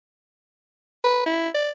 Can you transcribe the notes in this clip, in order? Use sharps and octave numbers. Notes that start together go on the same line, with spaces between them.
B4
E4
D5